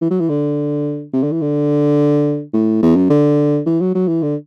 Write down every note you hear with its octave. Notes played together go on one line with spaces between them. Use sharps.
E3
F#3
E3
D3
C3
D3
E3
D3
A2
E2
F#2
D3
E3
F#3
F#3
E3
D3